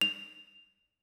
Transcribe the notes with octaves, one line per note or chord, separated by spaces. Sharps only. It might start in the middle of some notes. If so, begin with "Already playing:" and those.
F7